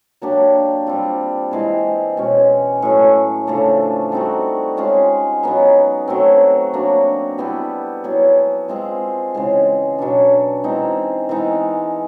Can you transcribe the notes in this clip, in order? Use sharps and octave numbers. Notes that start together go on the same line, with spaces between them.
F#3 A#3 D4 G4
G3 C4 F4
E3 G#3 C4 E4
B2 G#3 C#4
A2 F#3 A3
C#3 F3 A3 D4
G3 C4 D#4 F#4
G#3 C#4 F4 G#4
F#3 B3 D#4
F#3 A3 C4
F#3 A#3 D4 F#4
G3 B3 E4 G4
F#3 B3 E4 G#4
G#3 C4 F4 G#4
C#3 E3 G#3
B2 F#3 B3 D4
E3 G#3 C4 D#4
E3 G#3 B3 D#4